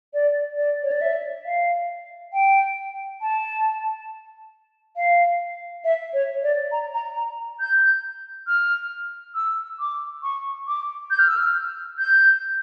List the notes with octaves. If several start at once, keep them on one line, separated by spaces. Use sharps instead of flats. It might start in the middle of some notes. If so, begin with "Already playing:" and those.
D5
D5
C#5
D5
E5
F5
G5
A5
F5
E5
C#5
D5
A#5
A#5
A#5
G6
F6
E6
D6
C#6
D6
G6
F6
E6
F6
G6